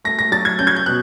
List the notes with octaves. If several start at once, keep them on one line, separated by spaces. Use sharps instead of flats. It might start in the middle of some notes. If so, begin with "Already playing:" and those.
A3 A#6
A#6
F#3 A6
G#6
C#4 G6
G#6
G6
B2 F#6